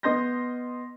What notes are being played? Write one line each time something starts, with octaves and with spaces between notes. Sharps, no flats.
B3 D#5 C6 G6 A#6